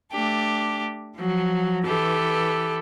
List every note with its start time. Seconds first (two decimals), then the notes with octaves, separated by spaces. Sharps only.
0.12 A3 D4 G4
1.15 F3 F#3
1.86 E3 G4 A4 B4